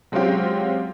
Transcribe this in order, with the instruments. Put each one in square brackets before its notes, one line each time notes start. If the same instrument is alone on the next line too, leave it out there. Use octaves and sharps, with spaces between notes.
[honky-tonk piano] F#3 G#3 C4 C#4 F4 G4